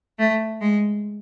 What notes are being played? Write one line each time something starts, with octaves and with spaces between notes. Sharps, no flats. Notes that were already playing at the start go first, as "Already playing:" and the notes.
A3
G#3